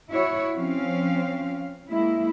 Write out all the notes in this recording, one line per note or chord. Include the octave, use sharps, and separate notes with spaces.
E4 F#4 C#5
F3 C4 C#4 F5
G#3 A#3 E4